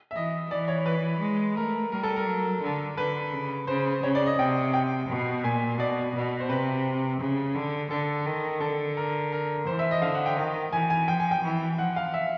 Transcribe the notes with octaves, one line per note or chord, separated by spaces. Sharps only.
E5
E3 D#5
E3 D5
C#5
B4
G#3
A3 A#4
G3 A#4
A4
A#4
F#3
D3
D3 B4
C#3
C#3 C5
C#3 C#5
D5
D#5
C3 G5
G5
B2
A#2 G#5
B2 D5
B2
C5
C3 B4
C#3
D3
D3 A4
D#3
D3 A4
A#4
A#4
E3 C5
E5
D#5
D3 F5
F#5
G5
D#3
E3 G#5
G#5
F3 G5
G#5
G5
E3
F3 F#5
F5
E5